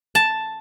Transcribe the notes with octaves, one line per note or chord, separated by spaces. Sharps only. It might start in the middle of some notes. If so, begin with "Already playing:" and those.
A5